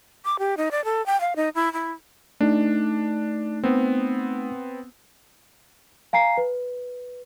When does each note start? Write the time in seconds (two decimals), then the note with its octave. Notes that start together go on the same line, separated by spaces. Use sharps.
0.25 D6
0.39 G4
0.57 D#4
0.71 D5
0.84 A4
1.06 G5
1.21 F5
1.36 D#4
1.55 E4
1.73 E4
2.41 A3 D4 D#4
3.64 B3 C4
6.13 F5 G#5 A#5 C7
6.37 B4